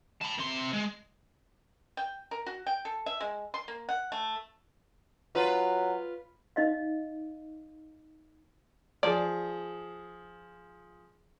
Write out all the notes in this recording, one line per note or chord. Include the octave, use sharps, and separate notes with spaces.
A5 B5
C3 C6
G#3
G5
A#4
F#4
G5
A4
E5
G#3
C6
A#3
F#5
A3
F#3 F4 B4
D#4 D#5 F5
F3 G#4 D5